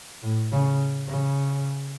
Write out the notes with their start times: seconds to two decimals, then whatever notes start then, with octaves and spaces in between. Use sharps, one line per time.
0.23 A2
0.52 C#3
1.08 C#3